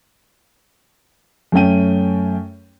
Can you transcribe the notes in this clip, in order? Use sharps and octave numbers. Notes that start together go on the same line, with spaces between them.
F#2 A3 C#4 G5 D#7